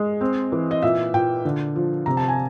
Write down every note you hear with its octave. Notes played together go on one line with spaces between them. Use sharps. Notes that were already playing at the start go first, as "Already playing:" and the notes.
Already playing: G#3
C4
E3
D#5
A#2 E5
A#2 G5
D3
F3
C3 A#5
A5
G#5